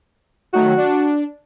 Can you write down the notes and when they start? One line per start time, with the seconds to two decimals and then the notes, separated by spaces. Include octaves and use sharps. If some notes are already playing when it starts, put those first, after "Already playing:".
0.53 D#3 F#3 A3 F#4
0.77 D4